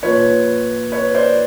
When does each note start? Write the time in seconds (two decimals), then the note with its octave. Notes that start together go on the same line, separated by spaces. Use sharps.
0.03 A#2 F3 B4 C#5
0.92 B4 C#5
1.15 C5 D5